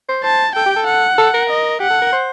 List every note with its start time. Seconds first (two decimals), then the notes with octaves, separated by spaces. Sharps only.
0.09 C5
0.24 C5 A5
0.55 A4 G5
0.66 G4
0.76 A4
0.87 F#5
1.18 A4
1.34 A#4
1.50 D#5
1.80 G4 F#5
1.90 A4
2.02 A#4
2.13 C5